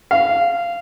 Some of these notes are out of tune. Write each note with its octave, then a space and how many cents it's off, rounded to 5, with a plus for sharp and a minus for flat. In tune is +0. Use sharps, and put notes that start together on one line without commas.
F5 -15